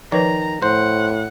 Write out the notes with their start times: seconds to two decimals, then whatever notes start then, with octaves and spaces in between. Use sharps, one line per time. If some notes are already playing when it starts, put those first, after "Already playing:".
0.12 D#3 F3 B4 C#5 A#5
0.62 A2 C5 F#5